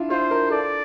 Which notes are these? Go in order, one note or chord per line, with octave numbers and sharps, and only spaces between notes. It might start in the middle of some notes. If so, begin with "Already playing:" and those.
Already playing: D4 E4 F4
F4 C5
A#4
A4 D5